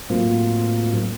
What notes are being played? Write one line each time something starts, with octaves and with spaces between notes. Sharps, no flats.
A2 F#3 A#3 C4 F4